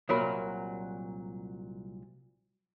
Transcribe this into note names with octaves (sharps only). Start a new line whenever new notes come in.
C2 A#2 F#3 F#4 A#4 B5